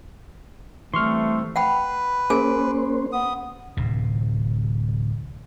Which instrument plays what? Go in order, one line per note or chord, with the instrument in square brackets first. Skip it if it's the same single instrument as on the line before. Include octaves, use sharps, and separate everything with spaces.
[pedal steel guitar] E3 G3 C4 [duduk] A3 [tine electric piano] C6 C#6 F6
[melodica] B4 [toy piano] F#5 G5 B5
[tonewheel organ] A#3 C#4 C5 [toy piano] G#4 A#4 G#5
[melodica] B3 D#6
[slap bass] D1 C3